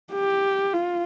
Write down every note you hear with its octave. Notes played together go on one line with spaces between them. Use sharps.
G4
F4